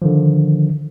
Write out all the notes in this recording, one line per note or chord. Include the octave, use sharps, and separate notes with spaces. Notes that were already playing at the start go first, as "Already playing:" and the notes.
D3 D#3 F3